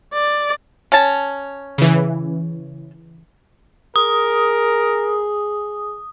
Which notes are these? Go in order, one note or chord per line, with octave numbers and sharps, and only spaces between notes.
D5
C#4 A5
C#3 E3
G#4 A#4 D#6